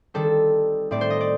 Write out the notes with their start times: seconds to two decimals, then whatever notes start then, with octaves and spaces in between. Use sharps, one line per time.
0.14 D#3 G3 C4 A4
0.91 A2 A3 C4 D5
1.01 C5
1.10 D#5
1.20 D5